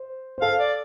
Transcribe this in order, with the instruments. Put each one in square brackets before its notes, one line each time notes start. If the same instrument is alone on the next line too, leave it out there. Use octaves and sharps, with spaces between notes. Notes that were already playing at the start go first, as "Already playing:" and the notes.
Already playing: [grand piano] C5
C5
[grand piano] A4 [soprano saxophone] F5
[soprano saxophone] D5